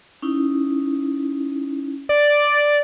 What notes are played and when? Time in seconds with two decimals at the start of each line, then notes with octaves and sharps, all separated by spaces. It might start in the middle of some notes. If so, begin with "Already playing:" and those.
0.22 C#4 D#4 E4
2.09 D5